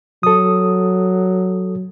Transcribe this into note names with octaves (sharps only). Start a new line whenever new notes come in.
F#3 A4 D#6